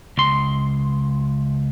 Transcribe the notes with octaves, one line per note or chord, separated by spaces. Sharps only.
C#2 C6